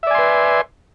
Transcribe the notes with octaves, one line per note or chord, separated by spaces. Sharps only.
B4 D5 E5 G#5 C6